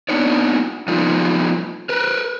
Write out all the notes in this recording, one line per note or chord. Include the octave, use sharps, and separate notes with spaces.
B3 D4 D#4 C#5 D5
F3 G3 A3 B3 D#4 F4
A#4 B4